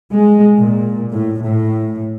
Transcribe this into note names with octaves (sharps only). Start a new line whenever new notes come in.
G#3
A#2
A2
A2